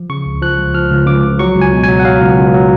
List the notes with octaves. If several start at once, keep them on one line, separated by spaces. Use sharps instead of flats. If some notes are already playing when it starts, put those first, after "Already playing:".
Already playing: F3
C#3 C#6
C#2
F3 F#6
C#2
F3 F6
C#2
C#2 D6
C#3
F#3 C#6
C#2
G#5
B2
F#3 G#5
F#5
F#3 F5
C#2
C#2
F#3